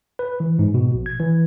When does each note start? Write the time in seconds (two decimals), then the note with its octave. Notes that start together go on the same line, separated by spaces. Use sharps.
0.19 B4
0.40 E3
0.59 G#2
0.74 B2
0.94 A#1
1.06 G#6
1.20 E3